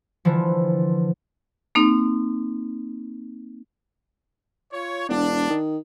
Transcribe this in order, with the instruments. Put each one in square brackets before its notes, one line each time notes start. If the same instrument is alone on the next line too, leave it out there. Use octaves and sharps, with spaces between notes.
[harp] D3 E3 F3
[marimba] A#3 C4 D#4
[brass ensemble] F4 C#5
[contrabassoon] E1 [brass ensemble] D4
[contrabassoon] D#3